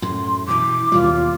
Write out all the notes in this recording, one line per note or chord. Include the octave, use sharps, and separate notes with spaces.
F#2 A2 C6
B2 E3 D6
D#2 B2 G3 F4